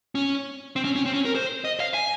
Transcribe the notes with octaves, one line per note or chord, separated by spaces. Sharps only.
C#4
C4
C#4
C#4
C4
C#4
A#4
C5
D#5
F5
G#5